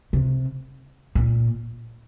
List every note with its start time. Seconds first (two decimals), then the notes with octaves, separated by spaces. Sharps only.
0.13 C3
1.15 A#2